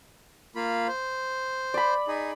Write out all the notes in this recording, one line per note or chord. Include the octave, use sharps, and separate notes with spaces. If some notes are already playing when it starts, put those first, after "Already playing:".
A#3 F4 B5
C5
D5 B5
D#4 G#4